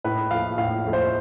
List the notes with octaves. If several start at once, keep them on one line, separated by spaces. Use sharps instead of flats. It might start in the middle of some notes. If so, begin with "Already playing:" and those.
A2 B4
F3 A3 F5
A2 F5
F3 A3
C5